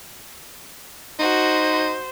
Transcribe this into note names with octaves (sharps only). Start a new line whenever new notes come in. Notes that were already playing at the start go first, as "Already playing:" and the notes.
D#4 F#4 C5